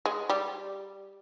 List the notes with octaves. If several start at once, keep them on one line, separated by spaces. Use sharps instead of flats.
G#3
G3